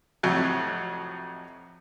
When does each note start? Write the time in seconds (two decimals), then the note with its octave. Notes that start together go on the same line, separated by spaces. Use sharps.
0.23 F2 A2 C3 F#3